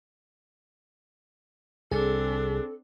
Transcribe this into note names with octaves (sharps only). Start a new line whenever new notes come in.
C2 C4 D4 G#4 A4